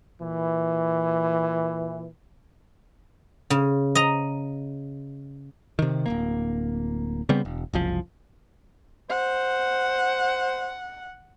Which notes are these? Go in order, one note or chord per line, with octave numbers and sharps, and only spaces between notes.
A#2 E3
C#3
D#5 A#5
C3 D#3
D1 C2 A#3
C#3 G3 B3 C4
E1
F#1 C2 F3
C5 F#5